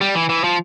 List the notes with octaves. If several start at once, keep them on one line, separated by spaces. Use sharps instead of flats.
G3
E3
E3
F3